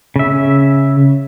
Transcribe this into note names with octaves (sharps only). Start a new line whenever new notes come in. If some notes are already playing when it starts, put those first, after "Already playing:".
C#3 E5